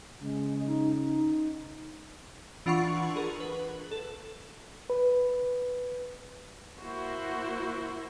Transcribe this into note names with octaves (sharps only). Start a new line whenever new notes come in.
C#3 G#3
D#4
D#4
E3 D4 F4 F#5 B5 C#6
G#4 A#4
B4
A4
B4
A#3 E4 F#4 C5